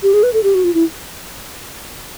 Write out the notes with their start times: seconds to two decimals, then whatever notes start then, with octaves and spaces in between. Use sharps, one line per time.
0.03 G4
0.14 G#4
0.23 B4
0.33 A4
0.43 G4
0.55 F#4
0.64 F4
0.74 E4